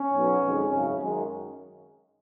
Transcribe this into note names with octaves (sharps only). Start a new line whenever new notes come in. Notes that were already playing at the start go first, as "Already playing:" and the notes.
Already playing: C#4
B1 B2 F#3
F2 D#3 G#3
G#1 F#2 C#3 C#4
F#2 D#3 G#3